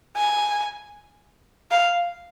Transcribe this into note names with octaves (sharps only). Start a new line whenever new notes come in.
G#5
F5